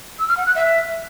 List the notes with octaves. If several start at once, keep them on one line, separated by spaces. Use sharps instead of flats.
E6
F6
F#5
F#6
E5